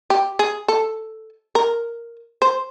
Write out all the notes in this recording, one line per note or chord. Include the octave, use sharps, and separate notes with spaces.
G4
G#4
A4
A#4
C5